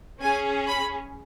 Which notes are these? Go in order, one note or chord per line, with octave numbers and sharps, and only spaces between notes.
C#4 G#4 G#5
B5